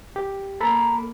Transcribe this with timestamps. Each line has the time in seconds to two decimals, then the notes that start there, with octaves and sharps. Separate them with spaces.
0.16 G4
0.61 A#3 A4 A#5 B5